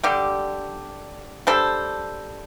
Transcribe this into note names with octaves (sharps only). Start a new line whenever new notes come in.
D3 G3 D4 G4
G3 D4 A4 C5